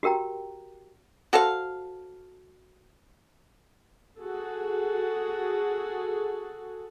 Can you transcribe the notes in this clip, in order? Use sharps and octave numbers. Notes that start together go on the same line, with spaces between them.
F#4 G4 A#4 G5 A#5
F#4 A4 C5 F5
F#4 G#4 A4